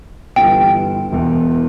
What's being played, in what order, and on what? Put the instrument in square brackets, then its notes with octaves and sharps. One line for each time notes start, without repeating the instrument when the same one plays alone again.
[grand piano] G1 G2 E3 G3 [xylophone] G5
[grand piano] E1 E2 E3